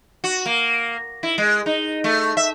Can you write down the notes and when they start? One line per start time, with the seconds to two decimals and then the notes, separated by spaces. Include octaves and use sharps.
0.24 F#4
0.46 A#3
1.23 E4
1.38 G#3
1.66 D#4
2.04 A3
2.37 E5